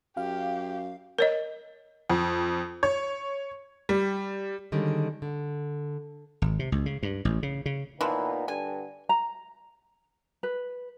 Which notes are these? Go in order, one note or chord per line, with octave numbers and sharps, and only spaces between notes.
F#2 G4 F5
A#4 C#5 D#5
F2
C#5
G3
D3 D#3 G3 G#3 C4 C#4
D3
G#1
C3
C#2
C#3
G2
A1
C#3
C#3
A#2 E3 F3 B3 D#4
G2 D3 G#5
A#5
B4